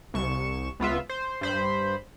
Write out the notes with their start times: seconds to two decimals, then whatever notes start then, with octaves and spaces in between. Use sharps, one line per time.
0.14 C2 C#6 E7
0.80 C#2 B3 F4 E5
1.09 C5
1.41 G2 C5 B5